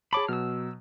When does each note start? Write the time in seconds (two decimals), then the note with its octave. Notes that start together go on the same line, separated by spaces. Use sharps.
0.13 G#4 C#5 A5 B5 D6
0.28 B2 F#3 E6 F6